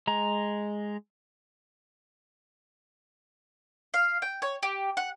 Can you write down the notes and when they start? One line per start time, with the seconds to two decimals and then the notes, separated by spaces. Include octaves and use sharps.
0.07 G#3 A#5
3.94 F5
4.22 G5
4.42 C#5
4.63 G4
4.97 F#5